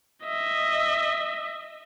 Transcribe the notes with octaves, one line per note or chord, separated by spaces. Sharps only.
D#5 E5